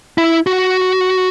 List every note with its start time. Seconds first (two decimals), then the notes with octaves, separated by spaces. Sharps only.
0.18 E4
0.47 F#4